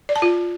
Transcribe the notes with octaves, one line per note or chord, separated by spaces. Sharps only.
D5
A5
F4